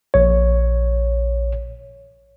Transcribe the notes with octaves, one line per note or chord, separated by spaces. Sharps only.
A#1 C#5